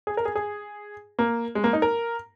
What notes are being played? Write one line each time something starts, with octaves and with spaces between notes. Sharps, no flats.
G#4
A#4
G#4
G#4
A#3
G#3
A#3
D#4
A#4